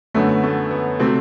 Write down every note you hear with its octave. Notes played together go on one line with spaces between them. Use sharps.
F#2 D3 A3 B3
A3
B3
C3 F#3 A3 C4